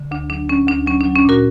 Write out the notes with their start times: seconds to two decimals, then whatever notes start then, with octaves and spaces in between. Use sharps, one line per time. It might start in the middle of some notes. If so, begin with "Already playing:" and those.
Already playing: D3
0.11 D2 D4
0.30 F#3 D4
0.49 F#3 C#4
0.67 D2 D4
0.86 F#3 C#4
1.00 D4
1.05 F#3
1.16 C#4
1.25 A#2 F#4 A#4